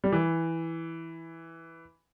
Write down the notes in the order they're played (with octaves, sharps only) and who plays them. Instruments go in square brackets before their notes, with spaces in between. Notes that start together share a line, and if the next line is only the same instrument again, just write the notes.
[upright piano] G3
E3